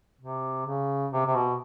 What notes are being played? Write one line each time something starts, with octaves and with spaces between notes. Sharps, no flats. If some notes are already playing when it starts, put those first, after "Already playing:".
C3
C#3
C3
C3
B2